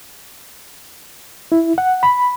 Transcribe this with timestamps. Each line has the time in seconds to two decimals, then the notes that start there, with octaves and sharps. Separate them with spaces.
1.52 E4
1.78 F#5
2.03 B5